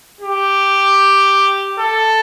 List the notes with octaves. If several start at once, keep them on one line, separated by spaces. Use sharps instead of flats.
G4
A4